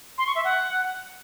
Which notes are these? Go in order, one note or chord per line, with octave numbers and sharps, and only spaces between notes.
C6
C#6
E5
F#5